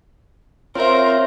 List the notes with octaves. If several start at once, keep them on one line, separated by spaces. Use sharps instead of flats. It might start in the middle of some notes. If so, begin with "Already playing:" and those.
C4 F4 A#4 C5 C#5 E5